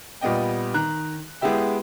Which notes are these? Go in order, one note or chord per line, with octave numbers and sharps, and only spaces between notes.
A#2 G3 B3 D#5 G5
D#3 A#5 F#6
G#3 B3 E4 G4 E5 G5